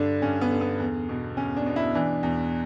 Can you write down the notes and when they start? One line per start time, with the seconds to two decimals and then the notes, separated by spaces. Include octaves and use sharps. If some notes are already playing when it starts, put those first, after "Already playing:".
Already playing: G2 D3 D4
0.22 G2 C#4
0.41 B3
0.50 D3
0.61 B3
0.79 E2
1.09 B2
1.37 E2 C#4
1.57 D4
1.66 B2
1.76 E4
1.95 E3 D4
2.23 E2